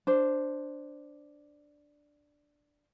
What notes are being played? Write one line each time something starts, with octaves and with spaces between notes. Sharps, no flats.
D4 C5